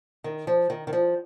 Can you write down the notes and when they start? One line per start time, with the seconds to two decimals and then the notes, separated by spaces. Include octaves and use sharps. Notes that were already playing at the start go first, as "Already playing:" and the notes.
0.24 D#3
0.47 F3
0.70 D#3
0.87 D#3
0.93 F3